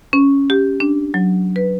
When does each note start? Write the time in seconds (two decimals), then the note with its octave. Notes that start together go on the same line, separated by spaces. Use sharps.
0.13 C#4
0.50 G4
0.80 D4
1.14 F#3
1.56 B4